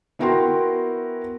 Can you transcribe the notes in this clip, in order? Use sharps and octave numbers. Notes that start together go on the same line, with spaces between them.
B3 E4 F#4 A#4 G5 C6